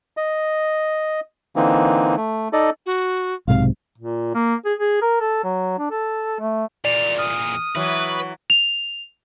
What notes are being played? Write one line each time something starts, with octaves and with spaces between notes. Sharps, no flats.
D#5
D3 E3 A#3 C4 D#4
A3
D#4 A4 D5 D#5
F#4
B1 G#2 C3 F5
A#2
A#3
G#4
G#4
A#4
A4
F#3
D4
A4
A3
E2 A#2 D5 F7
D#6 F6
E3 F#3 B4
F7